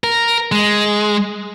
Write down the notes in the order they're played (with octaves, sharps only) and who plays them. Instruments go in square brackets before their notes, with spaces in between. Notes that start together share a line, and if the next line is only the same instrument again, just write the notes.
[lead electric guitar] A#4
G#3